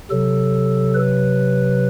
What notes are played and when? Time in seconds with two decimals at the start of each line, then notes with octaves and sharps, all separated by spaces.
0.11 C3 F#3 A4
0.95 B4